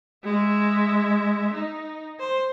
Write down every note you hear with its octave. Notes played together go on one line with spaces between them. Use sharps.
G#3 E5
D#4
C5